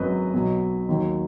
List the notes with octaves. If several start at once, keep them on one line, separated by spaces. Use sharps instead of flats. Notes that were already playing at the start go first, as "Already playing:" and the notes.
Already playing: G#1 F#2 F#3 B4 D#5
B1 B2 F#3
D#2 D#3 F#3